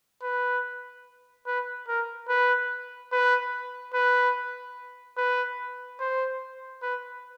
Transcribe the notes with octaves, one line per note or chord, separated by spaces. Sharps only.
B4
B4
A#4
B4
B4
B4
B4
C5
B4